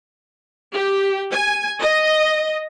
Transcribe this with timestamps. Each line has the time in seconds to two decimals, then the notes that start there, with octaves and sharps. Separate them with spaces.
0.72 G4
1.32 G#5
1.79 D#5